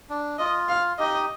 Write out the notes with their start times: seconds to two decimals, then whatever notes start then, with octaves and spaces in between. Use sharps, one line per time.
0.10 D4
0.39 F4 D#5
0.69 F5
0.99 D#4 G4 D#5